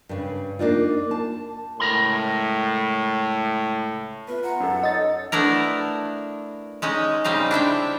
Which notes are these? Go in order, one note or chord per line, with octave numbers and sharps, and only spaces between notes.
G2 C#3
A#3 D4 D#4 F4
A5
C#2 A2 A#4 B5
B3 F4 B4 E5
F#5 A#5 C6
F#2 A4
D#4 A4 C#5 D#5 E6 A6
A3 B3 D4 E4 A#4
G#3 C#4 D#4
C#3 G3 C4 D#4 F5
D4 E4 E5 G5